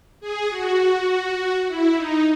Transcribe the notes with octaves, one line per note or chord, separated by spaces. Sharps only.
G#4
F#4
E4
D#4